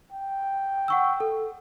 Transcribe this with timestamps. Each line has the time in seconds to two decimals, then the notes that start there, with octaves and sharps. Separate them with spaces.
0.13 G5
0.88 F#5 C#6 E6
1.20 A4